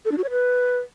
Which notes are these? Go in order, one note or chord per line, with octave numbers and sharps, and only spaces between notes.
A4
D4
F#4
C#5
B4